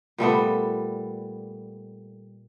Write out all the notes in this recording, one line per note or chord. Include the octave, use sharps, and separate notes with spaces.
A#2 G3 A3 B3